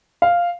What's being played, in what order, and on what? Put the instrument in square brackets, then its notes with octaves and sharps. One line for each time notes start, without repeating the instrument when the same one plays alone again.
[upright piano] F5